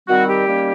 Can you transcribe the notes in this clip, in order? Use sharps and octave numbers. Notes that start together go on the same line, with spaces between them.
D#3 G3 C4 F#4
G4
D#3 G3 A#3 C#4